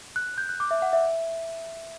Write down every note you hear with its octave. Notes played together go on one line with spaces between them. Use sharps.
F#6
G6
F#6
D6
E5
F#5
E5